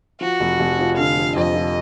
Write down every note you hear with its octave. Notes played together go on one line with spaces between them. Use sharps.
F3 F#4
F1
F1
F3
D3 F5
F3
F2 D#5
F3